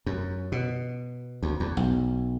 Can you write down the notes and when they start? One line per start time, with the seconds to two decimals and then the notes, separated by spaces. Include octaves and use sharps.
0.06 F#2
0.52 B2
1.43 D2
1.60 E2
1.77 B1